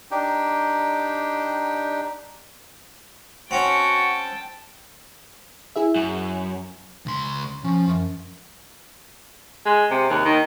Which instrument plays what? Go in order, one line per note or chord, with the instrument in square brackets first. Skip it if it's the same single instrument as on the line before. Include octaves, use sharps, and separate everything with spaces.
[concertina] D4 D#4 G4 G5
[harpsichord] C4 C#4 [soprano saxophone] F#4 [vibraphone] F#5 [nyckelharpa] G5 A5
[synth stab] E4 G#4 E5
[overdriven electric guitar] F#2
[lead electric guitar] C#2 C6
[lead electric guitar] F3 [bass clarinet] C#4
[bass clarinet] F#2
[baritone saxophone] G#3
C3
D#2
D#3